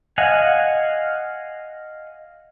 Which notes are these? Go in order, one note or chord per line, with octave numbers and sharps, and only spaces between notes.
D#5 F5 F#5 G#5